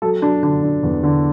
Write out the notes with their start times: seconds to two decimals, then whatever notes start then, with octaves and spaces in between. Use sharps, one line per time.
0.02 F#3 A4
0.22 F#3 D4
0.43 D3 D4
0.63 D3
0.83 E2
1.03 D3